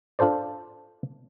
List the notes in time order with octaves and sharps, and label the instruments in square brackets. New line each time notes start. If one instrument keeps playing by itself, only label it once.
[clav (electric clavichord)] D4 F4 A4 C5 D5